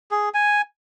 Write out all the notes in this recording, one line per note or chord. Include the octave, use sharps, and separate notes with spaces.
G#4
G#5